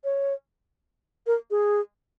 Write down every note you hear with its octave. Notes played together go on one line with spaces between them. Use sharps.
C#5
A#4
G#4